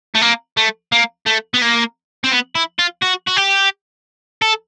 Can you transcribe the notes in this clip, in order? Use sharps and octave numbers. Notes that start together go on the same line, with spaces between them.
A3
A#3
A3
A#3
A3
B3
A#3
C4
B3
E4
F4
F#4
F#4
G4
A4